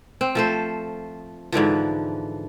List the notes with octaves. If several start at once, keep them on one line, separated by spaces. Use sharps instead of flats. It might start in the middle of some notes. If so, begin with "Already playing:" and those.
C4
F3 A3 C5
G#2 D3 E3 F3